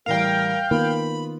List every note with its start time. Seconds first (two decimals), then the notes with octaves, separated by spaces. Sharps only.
0.06 A2 E3 G3 A#4 F5 G5
0.71 D#3 A#3 B3 F4 B5